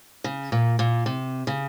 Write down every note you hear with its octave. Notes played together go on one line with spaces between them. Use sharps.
C#3
A#2
A#2
C3
C#3